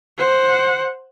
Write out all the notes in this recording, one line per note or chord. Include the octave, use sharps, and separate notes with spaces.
C5 F#5